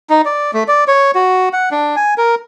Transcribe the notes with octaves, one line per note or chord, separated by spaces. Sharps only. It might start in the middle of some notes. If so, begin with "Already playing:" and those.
D#4
D5
A3
D5
C#5
F#4
F#5
D4
G#5
A#4